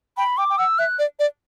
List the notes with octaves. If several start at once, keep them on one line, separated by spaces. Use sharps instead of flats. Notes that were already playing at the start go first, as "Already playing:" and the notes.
G5 B5
G5 D6
G5
F#5 E6
E5 F#6
D5
D5